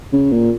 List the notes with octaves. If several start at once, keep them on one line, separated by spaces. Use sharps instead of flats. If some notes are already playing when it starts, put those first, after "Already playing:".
C#3
A#2